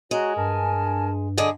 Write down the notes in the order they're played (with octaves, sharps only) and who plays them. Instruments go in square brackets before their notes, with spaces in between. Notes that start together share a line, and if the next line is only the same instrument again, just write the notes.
[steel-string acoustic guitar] G#3 [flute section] F#4 C#5 A#5
[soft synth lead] G2 [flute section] A#4 G#5 A5
[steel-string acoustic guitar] D3 G#4 D#5